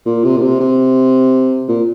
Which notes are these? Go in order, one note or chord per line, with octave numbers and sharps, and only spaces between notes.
A#2
C3
A#2
C3
C3
A#2